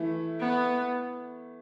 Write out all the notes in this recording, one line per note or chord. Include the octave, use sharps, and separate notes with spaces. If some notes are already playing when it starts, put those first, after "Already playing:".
Already playing: E3 A3 E4
B3